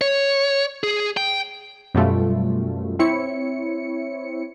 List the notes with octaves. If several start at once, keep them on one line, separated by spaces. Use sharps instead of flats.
C#5
G#4
G5
F#2 B2 G3 A3 F4
C4 E4 C#5 C#7